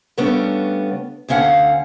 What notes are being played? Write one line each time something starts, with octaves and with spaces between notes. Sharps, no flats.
C#3 G3 A3 B3 C#4 D4
D2 D3 C#4 F5 F#5